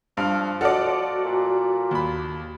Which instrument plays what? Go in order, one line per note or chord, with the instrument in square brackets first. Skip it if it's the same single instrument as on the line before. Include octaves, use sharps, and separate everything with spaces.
[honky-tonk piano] G2 [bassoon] F3 [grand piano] F5 F6
[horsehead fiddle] F#4 [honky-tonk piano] A4 D5 [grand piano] D#5 F#5 F6
[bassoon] A#2
[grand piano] D#2 B5